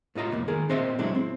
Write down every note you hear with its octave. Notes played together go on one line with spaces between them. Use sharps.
A2 F4 D#5 A#5 C6
C2 F2 A#3
D#3 G#4 A#4
A#2 C4 C5 D#5 E5 C6
A#2 F#3 G#3 D4 E4
C4